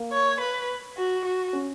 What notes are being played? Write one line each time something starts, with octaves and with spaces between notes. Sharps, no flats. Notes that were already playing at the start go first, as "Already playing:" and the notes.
Already playing: A#3
C#5
B4
F#4
F#4
C#4